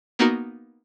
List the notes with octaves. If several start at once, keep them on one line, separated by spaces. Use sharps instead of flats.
A#3 B3 D#4 F#4 A#4